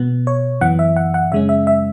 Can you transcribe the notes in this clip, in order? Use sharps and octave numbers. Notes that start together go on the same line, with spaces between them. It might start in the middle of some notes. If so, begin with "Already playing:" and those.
Already playing: B2 B3
C#5
F#2 E3 B3 F#5
E5
F#5
F#5
F#2 C#3 G#3 C#4 E5
E5
E5